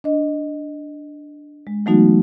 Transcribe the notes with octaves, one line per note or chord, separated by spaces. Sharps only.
D4 D#5
G#3
E3 F#3 A3 B3 D#4 F#4